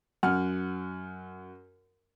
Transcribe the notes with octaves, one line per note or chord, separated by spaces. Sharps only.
F#2 F#5 F6